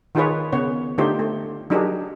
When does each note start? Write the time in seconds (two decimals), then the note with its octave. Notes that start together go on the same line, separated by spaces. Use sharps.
0.15 D#3 D#4 F4 G#4 B4 C#5
0.53 C#3 B3 C#5
0.98 D3 A3 D#4 F4 G4 C5
1.19 A3
1.70 F#3 D4 D#4 G4 G#4 A#4